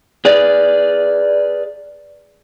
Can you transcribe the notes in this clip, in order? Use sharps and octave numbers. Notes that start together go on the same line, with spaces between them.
G#4 B4 D5